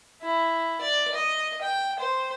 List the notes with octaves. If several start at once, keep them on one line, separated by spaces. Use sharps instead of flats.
E4
D5
D#5
G5
C5